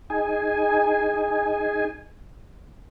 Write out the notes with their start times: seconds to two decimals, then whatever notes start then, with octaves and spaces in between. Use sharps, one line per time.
0.10 D#4 G#4 G#5